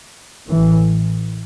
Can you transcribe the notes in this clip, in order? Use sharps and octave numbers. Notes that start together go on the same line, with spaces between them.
A1 A2 E3